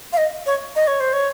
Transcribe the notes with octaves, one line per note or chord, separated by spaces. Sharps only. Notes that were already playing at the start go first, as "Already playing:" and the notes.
F5
D#5
C#5
D#5
C#5
C5
C#5